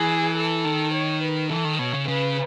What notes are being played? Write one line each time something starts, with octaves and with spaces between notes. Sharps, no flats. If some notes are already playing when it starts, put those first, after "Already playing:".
Already playing: E3 G#4
A4
D#3
C#5
B4
E3 A4
D#3
B2 C#5
C#3
C#3 B4